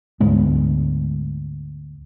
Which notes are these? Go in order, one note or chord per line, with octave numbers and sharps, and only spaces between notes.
D2 G#2 G#3 B3